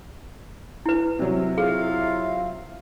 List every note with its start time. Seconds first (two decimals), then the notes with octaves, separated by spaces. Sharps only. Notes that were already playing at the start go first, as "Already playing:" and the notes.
0.86 E4 B4
1.19 C3 F#3
1.58 E4 F4 G#4 F5